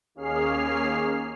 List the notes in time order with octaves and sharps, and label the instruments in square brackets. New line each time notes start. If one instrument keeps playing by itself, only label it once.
[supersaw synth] D#2 A#3 C#4 G#4 F6 C7